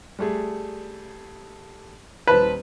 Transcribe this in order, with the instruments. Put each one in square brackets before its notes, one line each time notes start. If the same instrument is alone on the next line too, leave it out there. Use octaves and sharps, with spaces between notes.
[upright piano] G3 A3 G#4
[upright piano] D#1 C5 A5 [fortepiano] B4